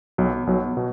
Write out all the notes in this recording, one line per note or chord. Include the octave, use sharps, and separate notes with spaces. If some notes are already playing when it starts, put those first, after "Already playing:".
B1 B2 F#3
B1 B2 F#3
B2